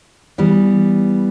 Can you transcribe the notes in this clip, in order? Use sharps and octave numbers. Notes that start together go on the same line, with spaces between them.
E3 G3 B3